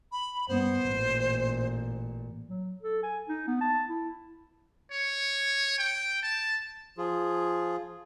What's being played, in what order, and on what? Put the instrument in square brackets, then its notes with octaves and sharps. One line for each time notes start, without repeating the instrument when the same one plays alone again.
[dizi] B5
[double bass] G2 B3 [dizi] C5
[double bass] A1 A#2
[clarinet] F#3
A4
G#5
D#4
B3
A5
E4
[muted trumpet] C#5
G5
A5
[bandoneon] F3 F4 G#4